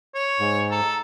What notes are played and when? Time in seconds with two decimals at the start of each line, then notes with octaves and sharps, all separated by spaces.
0.15 C#5
0.40 G#2
0.71 A4 A#5